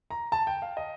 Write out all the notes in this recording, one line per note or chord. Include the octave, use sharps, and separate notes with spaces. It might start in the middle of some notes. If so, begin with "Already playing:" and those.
A#5
A5
G5
F5
D#5